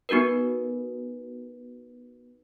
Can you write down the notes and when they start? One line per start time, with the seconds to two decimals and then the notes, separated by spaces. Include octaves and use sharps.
0.09 B3 D#4 F#4 A#4 B4